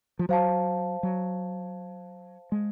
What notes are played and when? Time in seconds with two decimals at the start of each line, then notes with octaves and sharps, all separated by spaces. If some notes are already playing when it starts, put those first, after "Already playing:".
0.19 F3
0.29 F#3 C5 F5 A5
1.03 F#3
2.52 G#3